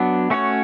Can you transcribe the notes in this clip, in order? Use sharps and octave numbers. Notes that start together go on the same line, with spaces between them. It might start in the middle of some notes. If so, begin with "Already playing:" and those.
Already playing: F#3 B3 D4
A3 C#4 F#4 C#5